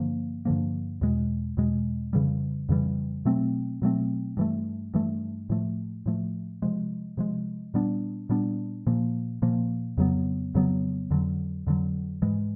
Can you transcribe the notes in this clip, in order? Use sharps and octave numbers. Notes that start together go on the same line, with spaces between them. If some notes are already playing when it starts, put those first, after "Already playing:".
Already playing: G2 D3 F3 A#3
G2 D3 F3 A#3
E2 B2 G#3
E2 B2 G#3
F2 C#3 E3 G3
F2 C#3 E3 G3
B2 F#3 A3 C4
B2 F#3 A3 C4
G2 E3 A3
G2 E3 A3
A2 F3 A3
A2 F3 A3
C3 F3 G#3
C3 F3 G#3
A#2 G3 B3 D4
A#2 G3 B3 D4
A#2 F3 A#3
A#2 F3 A#3
F2 C#3 F#3 B3
F2 C#3 F#3 B3
F2 D3 F#3
F2 D3 F#3
G#2 E3 G#3